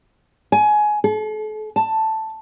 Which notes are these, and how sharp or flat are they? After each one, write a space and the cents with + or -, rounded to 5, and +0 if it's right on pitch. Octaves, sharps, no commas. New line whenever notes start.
G#5 +20
A4 -40
A5 +5